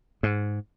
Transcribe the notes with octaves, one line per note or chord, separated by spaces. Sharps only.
G#2